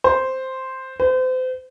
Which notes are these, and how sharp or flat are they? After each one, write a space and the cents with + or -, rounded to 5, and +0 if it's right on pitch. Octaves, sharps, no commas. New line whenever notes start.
C5 +0
C5 -35